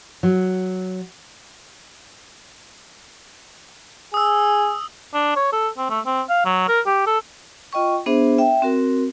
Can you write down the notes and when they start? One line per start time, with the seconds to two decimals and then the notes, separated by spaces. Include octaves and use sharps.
0.23 F#3
4.14 G#4 D#6 E6
5.14 D4
5.36 C#5
5.53 A4
5.78 C4
5.90 A3
6.06 C4
6.29 F5
6.45 F#3
6.69 A#4
6.86 G4
7.07 A4
7.73 F4 D#5 G5 C#6
8.06 B3 D4 G#4 C5 E5
8.38 E5 G5
8.62 C4 F#4 A#4